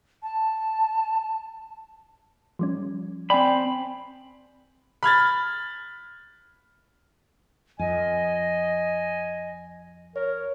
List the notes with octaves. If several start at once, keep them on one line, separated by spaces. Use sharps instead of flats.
A5
F3 G3 C#4
C4 D5 G5 G#5 B5
B5 F6 G#6 A6
F2 D#5 G#5
A#4 C#5